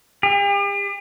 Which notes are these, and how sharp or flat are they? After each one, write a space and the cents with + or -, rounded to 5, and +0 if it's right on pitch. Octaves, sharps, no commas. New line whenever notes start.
G4 +45